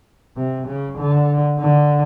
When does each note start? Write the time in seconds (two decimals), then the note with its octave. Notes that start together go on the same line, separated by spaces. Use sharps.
0.37 C3
0.67 C#3
0.98 D3
1.59 D3